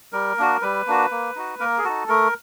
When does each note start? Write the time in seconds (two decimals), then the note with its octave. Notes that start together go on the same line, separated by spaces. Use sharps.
0.13 G3 A#4
0.38 A#3 D4 F#4
0.62 G3 B4
0.87 A#3 D4 F#4
1.11 A#3
1.36 D#4 F#4
1.60 A#3 A#4
1.78 G#4
1.84 D#4 F#4 A4
2.08 A3 A#4